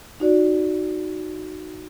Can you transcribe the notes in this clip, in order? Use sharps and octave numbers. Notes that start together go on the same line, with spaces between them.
D#4 F#4 D5